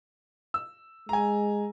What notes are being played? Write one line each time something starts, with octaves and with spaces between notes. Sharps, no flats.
E6
G#3 G#5 A#5